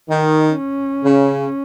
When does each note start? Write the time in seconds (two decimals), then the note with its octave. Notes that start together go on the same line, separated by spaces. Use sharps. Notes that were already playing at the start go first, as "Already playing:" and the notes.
0.10 D#3 D#4
0.57 C#4
1.04 C#3